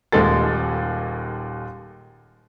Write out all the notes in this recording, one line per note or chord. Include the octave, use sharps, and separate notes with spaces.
D#1 D#2 G#3 A4 A6